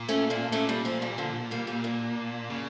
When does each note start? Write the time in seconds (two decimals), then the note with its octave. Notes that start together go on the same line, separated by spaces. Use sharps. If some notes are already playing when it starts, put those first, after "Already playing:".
Already playing: A#2
0.09 A3 C#4
0.30 A#3 D4
0.52 A#2 A3 C#4
0.69 G3 A#3
0.85 F3 A3
1.02 E3 G3
1.18 D3 F3
1.51 G3 A#3
1.67 G3 A#3
1.84 A#3 D4
2.50 C#3